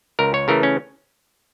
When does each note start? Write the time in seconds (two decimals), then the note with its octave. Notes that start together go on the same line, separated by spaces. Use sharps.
0.19 C#2 A#4
0.34 C#5
0.48 C#3 E3 A3 A#4
0.63 C#4